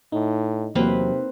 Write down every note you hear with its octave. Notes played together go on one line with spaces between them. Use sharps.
A2 D#4
E2 C3 F#3 A#3 C4 B4